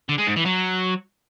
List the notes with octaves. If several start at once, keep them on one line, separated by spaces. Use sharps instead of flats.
D3
G#3
G#2
E3
F#3